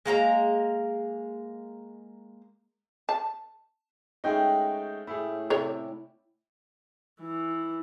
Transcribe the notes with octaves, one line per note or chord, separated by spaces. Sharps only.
G#3 A#3 B4 A#5
A5
G#3 A3 C#4 D#4 F#5 G5
A2 A3 E4 G#4 E5
C3 A4 C#5 D5
E3